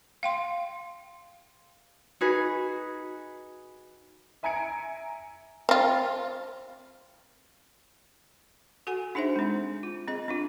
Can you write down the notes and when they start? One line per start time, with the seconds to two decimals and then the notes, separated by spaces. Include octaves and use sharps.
0.23 F5 G5 C6
2.21 D#4 F#4 G#4 B4
4.43 E5 G#5 A#5 G#6 C#7 D7
5.69 C4 F4
8.87 F#4 A4 F#5 G#5
9.15 D4 D#4 G#4 C5 E5
9.36 G#3 C4
9.83 F4
10.08 C4 G#4 D#5
10.28 C4 D4 F4